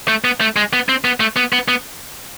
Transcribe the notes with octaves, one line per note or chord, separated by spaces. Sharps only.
A3
B3
A3
G#3
B3
C4
B3
A3
B3
B3
B3